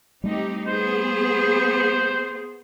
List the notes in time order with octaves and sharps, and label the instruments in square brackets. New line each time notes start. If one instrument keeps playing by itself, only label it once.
[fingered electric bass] G3 A3 [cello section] C4 D#4 G4
[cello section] B3 G#4 [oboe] C5